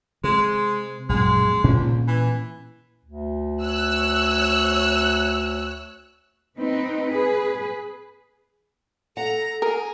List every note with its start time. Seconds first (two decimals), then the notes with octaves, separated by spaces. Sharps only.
0.24 C3 G#3
1.09 A#1 F#2 B2 G#3
1.64 C#2 A#2 C#4
2.08 E3
3.05 D2
3.63 C#5 E6 F#6
6.57 C4 D#4 B4
7.09 G#4 B4
9.17 A4 F#5 A#5
9.62 G#4 A#4